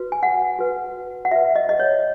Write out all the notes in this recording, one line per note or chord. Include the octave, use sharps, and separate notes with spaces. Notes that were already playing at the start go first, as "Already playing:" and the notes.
Already playing: F#4 B4
G#5
F#5
F#4 B4
F#5
F#4 B4 E5
D#5
D#5
C#5